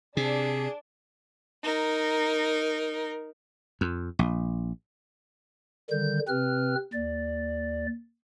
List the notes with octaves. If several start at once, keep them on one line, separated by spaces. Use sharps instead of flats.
C3 D4 G#4
D#4 A#4
F2
A#1
D3 D#3 G3 G6
C3 C4 B4 F6
D#2 D5